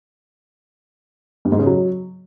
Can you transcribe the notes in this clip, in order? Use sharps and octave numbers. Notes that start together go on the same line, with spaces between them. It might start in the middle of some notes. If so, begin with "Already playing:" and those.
G2
G#2
C#3
F#3